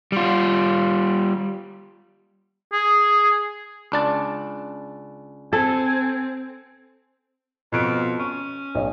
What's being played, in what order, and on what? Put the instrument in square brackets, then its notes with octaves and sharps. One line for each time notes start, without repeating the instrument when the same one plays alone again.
[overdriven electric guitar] G3 F4
[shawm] G#4
[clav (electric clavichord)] C#2 D4 A5
[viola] C4 [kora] A4 [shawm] G#5
[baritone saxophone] F2 [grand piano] B2 D7
[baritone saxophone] C#4 [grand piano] C#6
[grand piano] B1 D#5